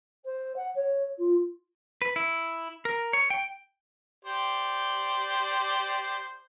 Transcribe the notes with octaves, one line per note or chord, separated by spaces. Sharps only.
C5
F#5
C#5
F4
B4
E4
A#4
C#5
G5
G4 C5 D5